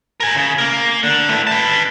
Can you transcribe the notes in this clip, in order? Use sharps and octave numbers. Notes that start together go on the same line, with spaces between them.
A#4 G#5
C#3
A#3 A#4
D3
E3 A3
B4 A5